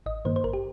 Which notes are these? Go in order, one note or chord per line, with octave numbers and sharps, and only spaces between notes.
G#1 D#5
G2 D#3 A#3 C5
C5
G#1 A#4
G4